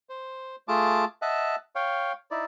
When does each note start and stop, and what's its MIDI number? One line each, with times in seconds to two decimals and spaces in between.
0.09 0.56 72
0.68 1.05 57
0.68 1.05 65
0.68 1.05 68
0.68 1.05 81
0.68 1.05 86
1.22 1.56 75
1.22 1.56 76
1.22 1.56 78
1.22 1.56 81
1.75 2.12 73
1.75 2.12 77
1.75 2.12 79
2.31 2.45 63
2.31 2.45 64
2.31 2.45 74